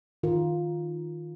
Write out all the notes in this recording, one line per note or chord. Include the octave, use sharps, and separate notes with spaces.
D#3 F4 A#4